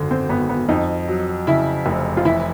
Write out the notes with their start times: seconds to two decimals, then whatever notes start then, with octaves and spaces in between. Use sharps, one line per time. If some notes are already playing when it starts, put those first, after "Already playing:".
Already playing: G#1 F#2 D3
0.11 C4
0.29 G#1 B3
0.49 B3
0.69 F2 D#4
1.08 F#3
1.47 C#3 E4
1.86 F1
2.17 F4
2.25 E3 E4